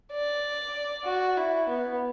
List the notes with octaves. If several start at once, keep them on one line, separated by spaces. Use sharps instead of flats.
D5
F#4
E4
B3